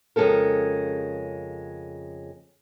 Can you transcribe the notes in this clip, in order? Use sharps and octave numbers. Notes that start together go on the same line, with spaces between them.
F2 C#3 G#3 C#4 A4 A#4